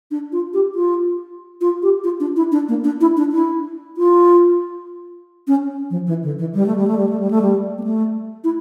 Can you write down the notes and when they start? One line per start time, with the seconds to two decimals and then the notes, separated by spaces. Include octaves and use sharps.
0.11 D4
0.32 F4
0.54 G4
0.75 F4
1.61 F4
1.83 G4
2.04 F4
2.20 D4
2.36 E4
2.52 D4
2.69 A#3
2.84 D4
3.01 E4
3.17 D4
3.32 E4
3.97 F4
5.48 C#4
5.90 F3
6.07 E3
6.23 D3
6.39 E3
6.54 G3
6.66 A3
6.76 G3
6.87 A3
6.98 G3
7.09 A3
7.20 G3
7.31 A3
7.42 G3
7.78 A#3
7.84 A3
8.44 E4